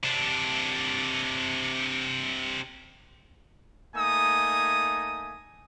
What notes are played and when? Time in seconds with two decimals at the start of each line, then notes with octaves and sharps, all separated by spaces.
0.04 C3 D4
3.96 A3 A#3 D#4 G#5 D#6